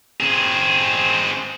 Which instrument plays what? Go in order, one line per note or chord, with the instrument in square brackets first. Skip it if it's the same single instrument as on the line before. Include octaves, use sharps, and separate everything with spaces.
[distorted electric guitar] C4 G#4